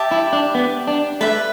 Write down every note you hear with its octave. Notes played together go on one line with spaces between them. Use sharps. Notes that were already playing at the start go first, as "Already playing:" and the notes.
Already playing: G4 E5 A5
E4
D4
B3
D4
A3 B4 E5 B5